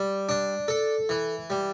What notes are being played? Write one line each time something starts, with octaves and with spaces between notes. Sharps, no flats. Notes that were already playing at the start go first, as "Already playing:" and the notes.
Already playing: G3
D4
A4
E3
G3